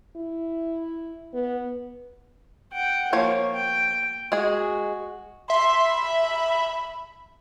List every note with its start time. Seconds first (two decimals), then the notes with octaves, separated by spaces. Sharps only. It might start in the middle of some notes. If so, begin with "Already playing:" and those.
0.16 E4
1.34 B3
2.73 F#5 G5
3.13 F3 A#3 C#5
3.54 G5
4.32 G#3 F#4 G#4
5.50 E5 C6
5.89 B5